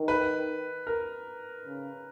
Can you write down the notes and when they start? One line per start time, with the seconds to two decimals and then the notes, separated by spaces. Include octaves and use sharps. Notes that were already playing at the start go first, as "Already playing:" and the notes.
Already playing: D#3
0.08 B4
0.87 A#4
1.65 C#3